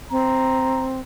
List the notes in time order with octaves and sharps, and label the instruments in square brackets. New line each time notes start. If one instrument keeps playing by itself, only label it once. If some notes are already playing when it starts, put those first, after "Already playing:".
[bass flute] C4 [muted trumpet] A#5